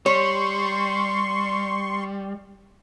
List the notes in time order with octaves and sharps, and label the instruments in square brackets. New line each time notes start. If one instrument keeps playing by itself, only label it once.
[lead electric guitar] G3 [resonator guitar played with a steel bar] C#5 [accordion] C6 C#6